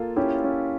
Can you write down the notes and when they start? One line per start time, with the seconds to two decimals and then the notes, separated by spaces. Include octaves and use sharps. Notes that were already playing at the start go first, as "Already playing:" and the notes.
Already playing: A#3 F4 A4
0.16 C#4 E4 G4
0.44 C#4